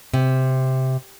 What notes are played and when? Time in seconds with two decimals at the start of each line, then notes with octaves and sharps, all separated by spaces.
0.14 C3